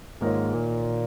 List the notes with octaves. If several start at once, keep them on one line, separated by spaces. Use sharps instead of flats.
G#2 D#3 A#3 F4 A#4 C#5
A#2